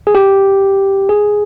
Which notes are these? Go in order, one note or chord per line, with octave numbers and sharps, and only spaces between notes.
G#4
G4
G#4